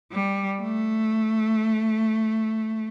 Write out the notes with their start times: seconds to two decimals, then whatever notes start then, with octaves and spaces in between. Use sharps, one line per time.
0.12 G3
0.62 A3